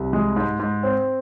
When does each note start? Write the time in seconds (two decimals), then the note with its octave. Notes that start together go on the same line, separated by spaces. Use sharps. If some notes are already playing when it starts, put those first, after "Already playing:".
Already playing: C2
0.13 G#3
0.36 G#2
0.59 G#2
0.83 C4